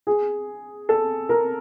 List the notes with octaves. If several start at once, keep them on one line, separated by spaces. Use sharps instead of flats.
G#4
A4
A#4